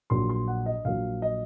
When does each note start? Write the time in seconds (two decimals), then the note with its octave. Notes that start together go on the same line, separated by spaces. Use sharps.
0.10 A#1 A#2 F#3 C6
0.29 C6
0.48 F#5
0.66 D#5
0.85 A#1 A#2 F#3 F5
1.22 D#5